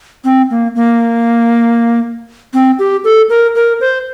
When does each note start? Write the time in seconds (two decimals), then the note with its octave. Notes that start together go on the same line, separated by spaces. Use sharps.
0.24 C4
0.50 A#3
0.75 A#3
2.54 C4
2.79 G4
3.04 A4
3.29 A#4
3.55 A#4
3.81 C5